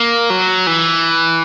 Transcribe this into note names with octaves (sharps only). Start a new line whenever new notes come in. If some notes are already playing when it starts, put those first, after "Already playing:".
Already playing: A#3
F#3
E3